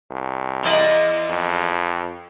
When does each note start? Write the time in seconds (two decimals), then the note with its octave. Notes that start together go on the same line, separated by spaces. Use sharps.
0.11 C2
0.63 E2 D5 D#5
1.30 F2